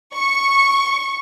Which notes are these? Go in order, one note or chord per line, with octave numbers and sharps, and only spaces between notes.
C#6